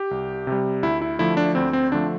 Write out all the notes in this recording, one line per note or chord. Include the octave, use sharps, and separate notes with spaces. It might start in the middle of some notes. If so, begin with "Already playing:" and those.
Already playing: G4
C2
C3 G3
D2 E4
E4
D3 F3 A3 E4
D4
D2 C4
C4
D3 F3 A3 D4